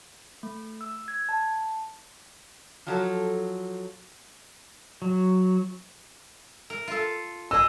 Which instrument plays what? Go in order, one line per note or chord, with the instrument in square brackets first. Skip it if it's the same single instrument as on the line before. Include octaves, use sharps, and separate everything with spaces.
[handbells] A3
E6
G#6
A5
[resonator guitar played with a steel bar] F3 F#3 A4
[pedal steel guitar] F#3
[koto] A#4
F4 A4
[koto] G#4 D#5 [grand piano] E6